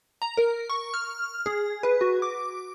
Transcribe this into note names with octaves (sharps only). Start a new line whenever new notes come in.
A#5
A#4
C#6
F6
G#4
B4
F#4
D6